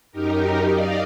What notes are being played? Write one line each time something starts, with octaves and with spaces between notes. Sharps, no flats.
F#2 D#4 G4 A#4
D5 D#5 F5